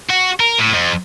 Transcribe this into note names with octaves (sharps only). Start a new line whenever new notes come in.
F#4
A#4
A2
F2